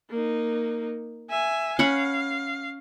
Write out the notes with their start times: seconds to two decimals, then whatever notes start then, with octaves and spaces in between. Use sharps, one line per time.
0.10 A#3 D#4
1.30 E5 G#5
1.79 C#4 F5 F#5 B5